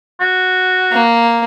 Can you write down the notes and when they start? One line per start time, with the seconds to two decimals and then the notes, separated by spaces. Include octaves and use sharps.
0.20 F#4
0.92 A#3